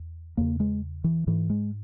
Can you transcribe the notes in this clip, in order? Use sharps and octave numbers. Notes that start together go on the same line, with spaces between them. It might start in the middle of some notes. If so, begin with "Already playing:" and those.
Already playing: E2
E2 C#3 A#3
G#3
E3
G#2 E3
G#3